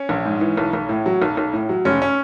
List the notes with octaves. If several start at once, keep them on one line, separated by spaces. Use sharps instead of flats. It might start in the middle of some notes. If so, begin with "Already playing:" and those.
Already playing: C#4
A#1
G#2
E3
B1
B1
A2
F#3
B1
B1
A2
F#3
F1 C#4
C#4